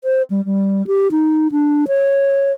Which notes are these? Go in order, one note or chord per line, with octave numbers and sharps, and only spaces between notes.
C5
G3
G3
G4
D#4
D4
C#5